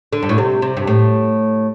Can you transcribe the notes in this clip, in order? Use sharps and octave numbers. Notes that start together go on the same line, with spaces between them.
D3
G2
A2
C3
C3
G2
A2